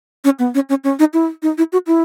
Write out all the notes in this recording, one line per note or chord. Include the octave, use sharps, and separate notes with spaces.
C#4
B3
C#4
C#4
C#4
D#4
E4
D#4
E4
F#4
E4